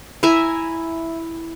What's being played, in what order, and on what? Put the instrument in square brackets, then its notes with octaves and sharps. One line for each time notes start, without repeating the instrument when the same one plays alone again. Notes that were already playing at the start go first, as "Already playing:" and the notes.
[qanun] E4 E5 G#5 A#5